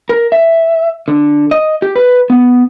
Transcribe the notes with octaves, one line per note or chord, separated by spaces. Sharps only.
A#4
E5
D3
D#5
G4
B4
B3